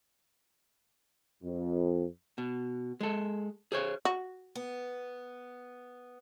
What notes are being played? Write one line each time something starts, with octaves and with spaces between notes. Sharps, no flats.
F2
B2
G#3 A4
G#4 C5 C#5
F#4
B3